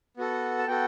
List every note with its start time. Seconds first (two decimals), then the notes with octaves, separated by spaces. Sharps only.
0.17 B3 F#4 A4
0.59 A5
0.67 B3 F#4 A4 G5